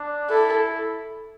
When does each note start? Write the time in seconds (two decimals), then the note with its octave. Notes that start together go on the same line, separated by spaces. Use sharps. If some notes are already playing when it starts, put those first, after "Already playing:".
Already playing: D4
0.30 E4 A4